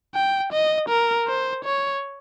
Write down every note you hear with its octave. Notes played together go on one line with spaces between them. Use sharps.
G5
D#5
A#4
C5
C#5